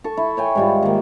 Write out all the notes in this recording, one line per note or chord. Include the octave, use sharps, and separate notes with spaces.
A4 C#6
E4
C#5 G5 G#5
G#2 G3 F4
D#3 A#3